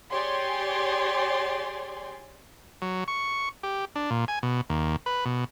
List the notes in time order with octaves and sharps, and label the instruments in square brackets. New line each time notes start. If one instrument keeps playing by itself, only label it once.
[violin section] G4 G#4 C#5 D5 G#5 C6
[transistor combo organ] F#3
C#6
G4
D4
A#2
G#5
B2
D#2
B4
B2